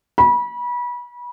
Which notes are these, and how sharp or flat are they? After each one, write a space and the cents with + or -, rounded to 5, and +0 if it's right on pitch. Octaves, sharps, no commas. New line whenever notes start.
B5 -30